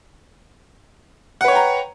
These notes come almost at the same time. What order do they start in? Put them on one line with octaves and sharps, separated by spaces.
F#5 B4 C#5 G5 A#5